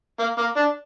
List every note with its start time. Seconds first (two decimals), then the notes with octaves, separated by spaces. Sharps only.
0.20 A#3
0.38 A#3
0.57 D4